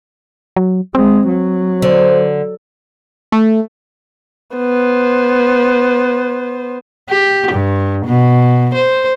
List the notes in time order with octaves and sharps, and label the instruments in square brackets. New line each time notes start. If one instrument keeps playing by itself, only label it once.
[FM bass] F#3
[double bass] G#3 [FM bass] C4
[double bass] F#3
[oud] D3 [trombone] C5
[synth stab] A3
[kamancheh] B3 C5
[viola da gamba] G4
G2
B2
C5